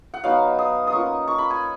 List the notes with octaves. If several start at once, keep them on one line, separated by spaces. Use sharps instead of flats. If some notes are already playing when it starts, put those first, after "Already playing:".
F#5
F#3 B3 D#4 F5
D#6
D#6
A#3 C#4 F4 C#6
C#6
B5
G#5